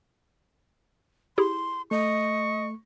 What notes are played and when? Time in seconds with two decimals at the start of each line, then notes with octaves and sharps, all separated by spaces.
1.38 E4 G4 G#4 C6
1.91 A3 D#5 C#6